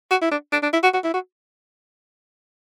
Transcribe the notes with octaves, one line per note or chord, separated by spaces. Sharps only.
F#4
E4
D4
D4
D4
E4
F#4
F#4
E4
F#4